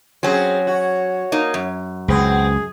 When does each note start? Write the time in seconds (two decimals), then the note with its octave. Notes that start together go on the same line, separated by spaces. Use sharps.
0.23 F#3 C4 C#4 G#4 C#5
0.67 F#4
1.32 A#3 D#4 A#4
1.54 F#2
2.08 C#2 B2 C4 G#4